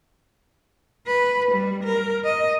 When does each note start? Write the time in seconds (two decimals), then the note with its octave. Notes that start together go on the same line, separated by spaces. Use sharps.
1.07 B4
1.52 G3
1.83 A#4
2.25 D#5